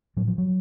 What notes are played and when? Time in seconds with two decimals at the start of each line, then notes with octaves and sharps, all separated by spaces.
0.17 A2 F#3
0.28 F3
0.38 F#3